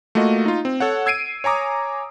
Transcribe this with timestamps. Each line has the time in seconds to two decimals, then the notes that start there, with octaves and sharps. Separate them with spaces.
0.15 A3 A#3 F4 F#4 D#5
0.46 D#4 F4
0.65 C4
0.80 A4 C#5 F#5
1.06 E6 G#6 C7 D7 D#7
1.44 C#5 G#5 A#5 D6 D#6